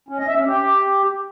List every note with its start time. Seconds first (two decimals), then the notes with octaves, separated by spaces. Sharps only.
0.09 C#4
0.18 D#5
0.28 E5
0.37 C#4
0.47 G4